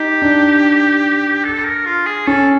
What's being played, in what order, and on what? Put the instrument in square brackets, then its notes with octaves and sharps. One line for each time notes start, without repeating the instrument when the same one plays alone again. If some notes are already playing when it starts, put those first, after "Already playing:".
Already playing: [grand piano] D#4 [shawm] G4
[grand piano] D4
[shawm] A4
A#4
F4
G#4
[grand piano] C#4 [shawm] A4